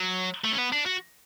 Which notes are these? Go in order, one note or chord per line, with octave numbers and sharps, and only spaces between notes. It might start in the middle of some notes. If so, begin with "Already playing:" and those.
Already playing: F#3
A3
C#4
B3
D4
F#4